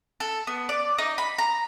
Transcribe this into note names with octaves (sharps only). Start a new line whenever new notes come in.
A4
B3
D5
D#4
B5
A#5